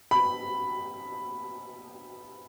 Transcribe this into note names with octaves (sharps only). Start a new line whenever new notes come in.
B5